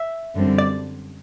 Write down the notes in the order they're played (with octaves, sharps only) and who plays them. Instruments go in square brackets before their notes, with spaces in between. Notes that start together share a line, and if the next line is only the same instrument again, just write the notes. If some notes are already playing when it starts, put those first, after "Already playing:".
Already playing: [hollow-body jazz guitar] E5
[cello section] F#2 D3 G3 C4
[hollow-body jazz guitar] D5